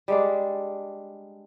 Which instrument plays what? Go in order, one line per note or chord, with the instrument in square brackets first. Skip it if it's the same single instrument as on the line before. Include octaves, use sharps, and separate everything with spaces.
[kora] G3 G#3 D4